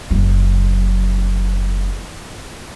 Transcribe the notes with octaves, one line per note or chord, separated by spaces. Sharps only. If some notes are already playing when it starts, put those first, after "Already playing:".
F#1 F#3